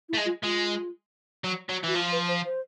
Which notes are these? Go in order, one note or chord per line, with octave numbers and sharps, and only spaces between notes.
E4
A3
G#3
F4
G#3 F4
F#3
F#3
E3 F#4
F3 F4
B4
C5
C5